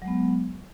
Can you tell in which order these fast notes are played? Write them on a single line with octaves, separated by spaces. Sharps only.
F#3 G#3 B3